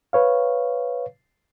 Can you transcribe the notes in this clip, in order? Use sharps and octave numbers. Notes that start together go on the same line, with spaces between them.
B4 C#5 F5